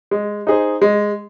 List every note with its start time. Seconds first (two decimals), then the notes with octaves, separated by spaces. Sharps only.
0.11 G#3
0.47 D#4 G#4 C5
0.82 G#3